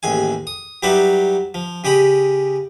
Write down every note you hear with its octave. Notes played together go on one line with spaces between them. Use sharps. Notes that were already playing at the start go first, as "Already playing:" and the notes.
A1 D#2 G#4 G#5
D#6
F#3 G3 D#4 B4 D5 E5
F3
C#3 G4 D#5 B5